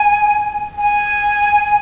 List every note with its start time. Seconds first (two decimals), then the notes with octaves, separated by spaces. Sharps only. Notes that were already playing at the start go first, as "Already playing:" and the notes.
Already playing: G#5
0.78 G#5